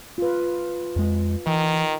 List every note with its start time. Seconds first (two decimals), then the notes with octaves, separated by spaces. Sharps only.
0.18 F4 B4
0.96 F2 G#3
1.47 D#3 E3